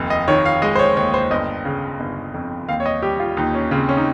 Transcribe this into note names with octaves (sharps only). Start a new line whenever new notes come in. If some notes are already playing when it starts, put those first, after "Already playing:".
Already playing: F1 D#2
D#5
D#3 C#5
F5
G#3 D#5
C5
C#5
D#2 C#5
C5
G1 D#5
C#3
G1
F2
D#2 F5
C#5
D#5
G3 G4
F4
D#2 D#4
C#4
C#3 C4
C#4
D#4